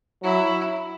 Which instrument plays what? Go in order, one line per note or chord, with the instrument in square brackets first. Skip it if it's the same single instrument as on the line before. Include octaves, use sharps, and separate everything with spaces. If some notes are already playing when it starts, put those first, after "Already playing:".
[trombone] F#3 [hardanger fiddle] E4